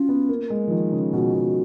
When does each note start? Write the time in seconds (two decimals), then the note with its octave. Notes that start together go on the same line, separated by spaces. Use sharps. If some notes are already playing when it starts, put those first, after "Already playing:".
Already playing: C#4 F4 F#4
0.09 B3
0.29 A#3
0.50 G#3
0.68 F3
0.71 D#3
0.92 C#3
1.13 B2 F#4
1.34 B2